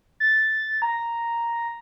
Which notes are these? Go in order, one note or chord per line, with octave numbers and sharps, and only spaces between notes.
A6
A#5